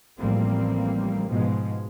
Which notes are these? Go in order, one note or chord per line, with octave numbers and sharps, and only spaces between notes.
A1 F3 G3 A#3 C4
G#2 B2 F3 G#3